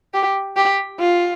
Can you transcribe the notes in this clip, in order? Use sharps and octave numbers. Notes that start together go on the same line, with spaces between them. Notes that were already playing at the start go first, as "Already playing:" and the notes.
G4
G4
F4